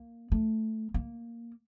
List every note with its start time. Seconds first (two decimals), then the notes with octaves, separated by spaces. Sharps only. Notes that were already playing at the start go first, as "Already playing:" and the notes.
Already playing: A#3
0.32 A3
0.94 A#3